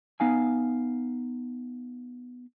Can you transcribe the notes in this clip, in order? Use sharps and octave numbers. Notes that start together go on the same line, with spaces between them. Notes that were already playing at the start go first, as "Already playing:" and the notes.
B3 D#4 F5 G#5